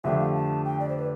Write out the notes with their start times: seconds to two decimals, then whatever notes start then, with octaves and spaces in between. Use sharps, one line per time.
0.04 F2 D3 A3 D4 G4 E5
0.19 F5
0.34 A5
0.65 G5
0.80 D5
0.89 C5
0.98 B4